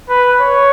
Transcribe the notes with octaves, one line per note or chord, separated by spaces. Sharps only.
B4
C#5